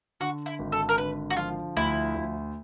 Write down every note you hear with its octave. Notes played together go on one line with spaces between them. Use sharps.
D3 F#4
E4
G#1
A4
A#4
D3 B4
F#4
F3 F4
D2 E4
D2